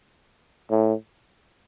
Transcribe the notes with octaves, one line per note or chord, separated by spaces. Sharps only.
A2